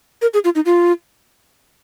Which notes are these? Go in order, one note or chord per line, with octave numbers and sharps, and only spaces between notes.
A#4
G#4
F4
D#4
F4